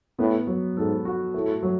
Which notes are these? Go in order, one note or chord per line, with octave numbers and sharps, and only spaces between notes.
A2 B3
F#3
G#2 A4
F#4
A2 A3
F#3